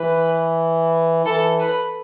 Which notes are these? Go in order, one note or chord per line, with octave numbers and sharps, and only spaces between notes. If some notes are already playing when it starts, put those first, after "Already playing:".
Already playing: E3 B4
E3 A4
B4